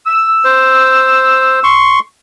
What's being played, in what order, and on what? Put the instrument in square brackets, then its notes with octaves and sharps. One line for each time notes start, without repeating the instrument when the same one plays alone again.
[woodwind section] E6
[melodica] C5
C6 C#6